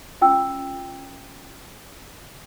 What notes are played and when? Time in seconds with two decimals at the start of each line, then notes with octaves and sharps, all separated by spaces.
0.21 C#4 F4 G5 E6